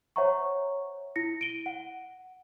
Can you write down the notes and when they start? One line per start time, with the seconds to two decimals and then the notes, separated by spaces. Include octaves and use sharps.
0.16 C5 C#5 E5 F#5 A#5 C#6
1.16 E4 A#6 C#7
1.41 D7 D#7 G7
1.66 F#5